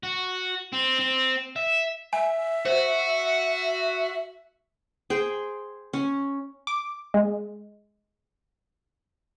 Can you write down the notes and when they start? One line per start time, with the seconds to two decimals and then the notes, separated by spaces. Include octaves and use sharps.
0.03 F#4
0.73 C4
0.99 C4
1.56 E5
2.13 E5 G#5
2.66 F#4 C5
5.10 G#4 C5 G5
5.93 C#4
6.67 D6
7.14 G#3